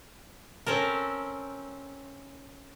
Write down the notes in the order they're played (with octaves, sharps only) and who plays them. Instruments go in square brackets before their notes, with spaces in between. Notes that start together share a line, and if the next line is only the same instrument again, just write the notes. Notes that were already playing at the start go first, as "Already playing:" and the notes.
[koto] C4 C#4 A4 A#4